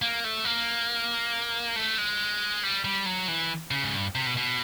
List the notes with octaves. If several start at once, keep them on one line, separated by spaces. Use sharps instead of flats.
A#3
A3
A#3
A3
G#3
G3
G3
F#3
E3
C#3
G#2
G2
C3
B2
B2